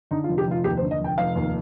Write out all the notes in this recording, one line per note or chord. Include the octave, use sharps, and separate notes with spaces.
D3 D#4
F4
F1
G4
F1 F4
D#2 G4
C5
D3
D#5
F1 G5
F1 F5
D#2